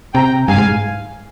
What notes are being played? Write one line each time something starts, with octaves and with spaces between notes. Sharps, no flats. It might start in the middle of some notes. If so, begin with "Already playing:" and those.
C3 G5 A#5
G2 F5 G#5
G#2